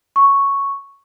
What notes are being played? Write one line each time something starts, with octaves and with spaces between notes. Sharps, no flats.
C#6